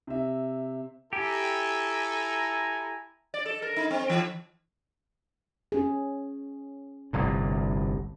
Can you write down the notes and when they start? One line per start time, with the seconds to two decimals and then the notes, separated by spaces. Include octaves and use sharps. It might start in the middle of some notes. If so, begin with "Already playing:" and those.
0.07 C3 E5
1.13 E4 G4 A4 G#5 A#5
3.34 D5
3.46 A4
3.62 A#4
3.76 D#4
3.91 C4
4.10 E3
5.72 C#4 G#4
7.13 G1 C2 A2